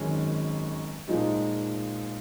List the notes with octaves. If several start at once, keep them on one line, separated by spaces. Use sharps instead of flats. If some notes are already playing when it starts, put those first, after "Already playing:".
Already playing: G#1 F#2 D#3 G#3 C#4
A#2 F3 G#3 D#4